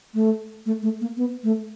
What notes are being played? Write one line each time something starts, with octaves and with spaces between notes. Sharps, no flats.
A3
A3
A3
A#3
B3
A3